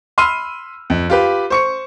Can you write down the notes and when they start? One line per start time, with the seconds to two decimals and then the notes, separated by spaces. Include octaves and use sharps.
0.18 B5 C6 E6 F6 D#7
0.90 F2
1.10 F4 G4 B4
1.50 C5 C#6 C#7